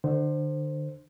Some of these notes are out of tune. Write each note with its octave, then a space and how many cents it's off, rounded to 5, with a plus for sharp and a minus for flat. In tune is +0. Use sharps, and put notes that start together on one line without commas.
D3 +35 C5 +0